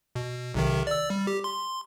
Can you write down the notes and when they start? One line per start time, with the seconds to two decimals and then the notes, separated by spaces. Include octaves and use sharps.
0.16 B2
0.54 B1 C3 D#3
0.87 D5 E6
1.10 G3
1.27 G4
1.44 C6